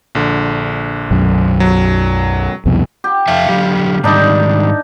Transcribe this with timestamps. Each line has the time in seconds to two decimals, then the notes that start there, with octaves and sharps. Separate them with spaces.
0.15 A#1 D3
1.11 B1 F#2
1.60 F#3
2.65 C2 F2 B2
3.04 G4
3.28 F2 E5 F5 A5
3.49 D3 F#3 G4
4.04 G#2 D#3 G3 D4 D#4